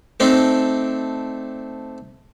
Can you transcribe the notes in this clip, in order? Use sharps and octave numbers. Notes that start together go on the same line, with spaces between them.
A3 C4 D4 D#4